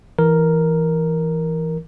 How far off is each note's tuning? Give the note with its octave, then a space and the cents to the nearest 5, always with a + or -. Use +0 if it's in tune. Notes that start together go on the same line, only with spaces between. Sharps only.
E3 +0 A#4 +0